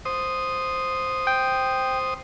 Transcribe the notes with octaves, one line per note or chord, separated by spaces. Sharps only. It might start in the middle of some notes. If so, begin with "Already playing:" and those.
C5 D#6
G5